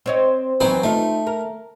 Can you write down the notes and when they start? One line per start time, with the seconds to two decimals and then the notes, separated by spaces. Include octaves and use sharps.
0.06 C4 C#5 D#5
0.61 E3 F#3 C4 D#4 B4 C5
0.84 A3 D#4 F4
1.27 A#4